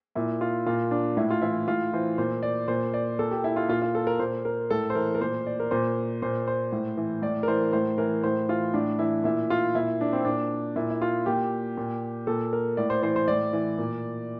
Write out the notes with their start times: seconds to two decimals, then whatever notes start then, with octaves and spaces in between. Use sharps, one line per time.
0.15 A#2 E4
0.41 F4
0.66 A#2 F4
0.91 D4
1.17 A2 E4
1.30 F4
1.42 E3 E4
1.68 A2 F4
1.93 E3 C5
2.18 A#2 C5
2.43 D5
2.68 A#2 C5
2.94 D5
3.19 A#2 A4
3.31 G4
3.44 E4
3.56 F4
3.69 A#2 F4
3.82 F4
3.95 A4
4.07 A#4
4.19 A#2 C5
4.45 A#4
4.70 A2 A4
4.90 C5
4.95 E3 A#4
5.15 A#4
5.20 A#2 C5
5.47 D5
5.60 A#4
5.71 A#2 C5
6.22 A#2 C5
6.48 C5
6.72 A2
6.97 E3
7.22 A2 D5
7.43 A#4
7.48 E3 C5
7.73 A2 C5
7.98 E3 A#4
8.23 A2 C5
8.49 E3 F4
8.74 A2 D4
8.99 E3 E4
9.24 A#2 E4
9.50 F4
9.75 A#2 E4
10.01 D4
10.13 C4
10.25 A#2 D4
10.76 A#2 E4
10.90 E4
11.02 F4
11.26 A#2 G4
11.77 A#2
12.27 A#2 A4
12.53 A#4
12.77 A2 D5
12.90 C5
13.02 E3 C5
13.16 C5
13.28 A2 D5
13.53 E3
13.78 A#2